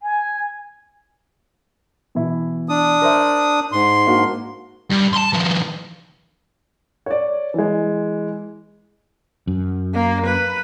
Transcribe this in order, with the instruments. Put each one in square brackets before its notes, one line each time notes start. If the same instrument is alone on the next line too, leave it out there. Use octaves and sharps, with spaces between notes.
[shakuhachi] G#5
[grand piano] B2 E3 E4
[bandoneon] D4 D#6
[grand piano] A#4 C5 E5
[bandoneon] G#2 C6
[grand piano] A#3 D4 F#4
[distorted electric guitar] G2
A5 C6
D#3 F3
[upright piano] C#5 D5
E3 G#3
[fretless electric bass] F#2
[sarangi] A#3
B4